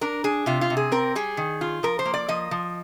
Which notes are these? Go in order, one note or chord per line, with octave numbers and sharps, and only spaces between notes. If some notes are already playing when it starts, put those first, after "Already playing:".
D4 A#4
D4 G#4
C3 F4
F4
C3
G#4
C4 A#4
G3 G#4
D#3
F4
F3 A#4
C5
A#3
D5
F3 D#5
F3